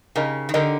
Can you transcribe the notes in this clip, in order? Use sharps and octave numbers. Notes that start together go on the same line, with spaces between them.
C#3 D#4 G4 A#4 D#5
D#3
D3 D#4 G4 A#4 D#5